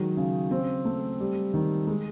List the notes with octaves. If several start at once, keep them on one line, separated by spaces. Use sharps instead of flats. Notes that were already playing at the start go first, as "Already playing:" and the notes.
Already playing: D#3 F#3 G#3
C#3
C4
A3
G3
D#3
G#3